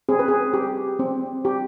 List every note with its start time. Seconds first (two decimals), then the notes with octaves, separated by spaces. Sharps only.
0.09 C4 G#4
0.19 B4
0.28 G#4
0.54 G4
0.99 C4
1.45 G4